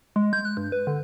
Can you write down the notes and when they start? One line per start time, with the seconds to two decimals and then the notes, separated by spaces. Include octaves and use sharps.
0.16 G#3
0.33 G6
0.45 F#6
0.57 G2
0.72 B4
0.87 D3